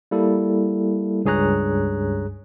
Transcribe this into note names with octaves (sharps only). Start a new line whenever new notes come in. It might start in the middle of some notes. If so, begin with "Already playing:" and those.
G3 A#3 E4 A4
C#2 G2 G#4 C#5 A#5 F#6